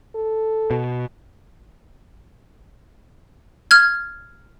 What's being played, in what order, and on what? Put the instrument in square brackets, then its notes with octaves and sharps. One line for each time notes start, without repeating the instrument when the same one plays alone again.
[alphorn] A4
[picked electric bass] B2
[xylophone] F6 G#6